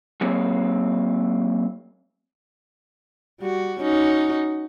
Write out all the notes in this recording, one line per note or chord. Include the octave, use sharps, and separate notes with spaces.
F#3 A#3 C4 G#4 C#5
G3 F#4
C#4 D#4 F#4